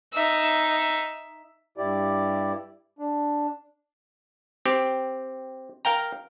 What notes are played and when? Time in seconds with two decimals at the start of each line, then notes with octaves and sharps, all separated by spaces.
0.13 D#4 E5
1.78 G2 E4 G4 D5
2.99 D4
4.65 C4 G4
5.85 A#4 F5 G5 A#5